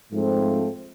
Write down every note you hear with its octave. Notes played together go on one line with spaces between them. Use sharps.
G#2 F3 A3 C4